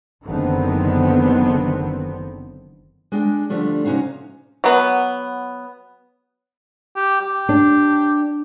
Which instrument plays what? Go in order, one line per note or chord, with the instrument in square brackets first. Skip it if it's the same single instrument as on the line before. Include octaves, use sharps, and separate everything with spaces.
[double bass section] F#1 D3 D#3 F#3 B3 C4
[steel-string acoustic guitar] G#3 D4 G5
D3 F3 G3 A3 D4
C3 C#4 D#4 F#4 F5
[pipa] F#3 B3
[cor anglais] G4
G4
[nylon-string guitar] D4